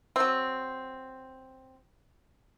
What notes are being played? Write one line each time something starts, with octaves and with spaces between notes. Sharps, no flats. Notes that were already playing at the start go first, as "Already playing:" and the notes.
F#3 C4